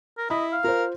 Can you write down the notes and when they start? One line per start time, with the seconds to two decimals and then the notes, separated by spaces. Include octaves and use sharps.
0.18 A#4
0.30 E4 D#5 B5
0.52 F5
0.64 F4 A#4 C5